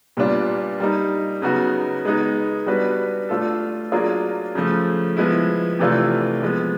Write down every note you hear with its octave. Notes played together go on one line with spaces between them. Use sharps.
A#2 G3 B3 D4 F4
G3 A#3 D#4
C#3 F#3 B3 D#4 F#4
G#3 B3 D#4 G#4
G3 B3 D4 F#4 B4
A3 D4 F4 A4
F#3 A#3 D4 F4 G#4
C#3 F3 A3
F3 G#3 B3 E4
C3 E3 A3 D4 F4
F3 G#3 B3